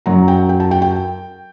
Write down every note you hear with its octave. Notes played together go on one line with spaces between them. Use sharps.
F#2 F#3 A#5
G5
G5
A5
G5
G5